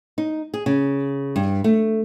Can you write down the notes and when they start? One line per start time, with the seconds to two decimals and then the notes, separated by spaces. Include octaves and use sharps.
0.18 D#4
0.54 G#4
0.66 C#3
1.36 G2
1.64 A3